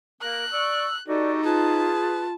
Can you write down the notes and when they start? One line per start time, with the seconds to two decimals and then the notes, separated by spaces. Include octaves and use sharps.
0.22 A#3 A#4 F#6
0.52 D5 C#6 E6
1.08 D#4 F#4 G4 A4 D5
1.44 F4 G#4 B4 A5